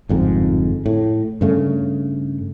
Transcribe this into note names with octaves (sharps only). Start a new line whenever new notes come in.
G1 F2 G#2
A2
G2 C#3 A3